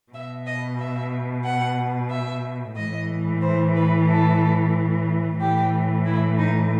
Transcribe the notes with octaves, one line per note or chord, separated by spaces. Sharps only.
B2 E5
D#5
E5
F#5
E5
A2 E3 D#5
C5
B4
A4
A2 E3 G4
E4
D#4